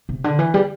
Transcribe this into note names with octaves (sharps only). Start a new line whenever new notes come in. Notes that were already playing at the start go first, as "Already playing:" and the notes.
C3
D3
E3
G3